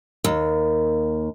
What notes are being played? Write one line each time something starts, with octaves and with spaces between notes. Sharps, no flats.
D#2